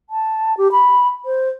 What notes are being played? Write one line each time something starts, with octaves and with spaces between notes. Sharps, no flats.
A5
G4
B5
C5